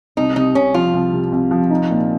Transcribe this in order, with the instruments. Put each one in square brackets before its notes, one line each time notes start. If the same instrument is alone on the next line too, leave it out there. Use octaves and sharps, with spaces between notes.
[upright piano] C2 [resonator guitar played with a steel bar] D#4
[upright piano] C3 [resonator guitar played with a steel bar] D#4
[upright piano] C2 [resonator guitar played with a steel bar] C#4
[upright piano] F3 [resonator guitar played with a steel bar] F4
[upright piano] C2
C3
C2
F3
D#4
A#2